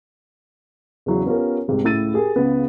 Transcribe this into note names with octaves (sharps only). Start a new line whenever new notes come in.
E2 C#3 F#3 E4
B3 C#4 F4 G4 A#4
C2 G#2 C3
C#2 A2 E4 E6 A6 D#7
G4 G#4 A#4
C#2 C#3 B3 G#4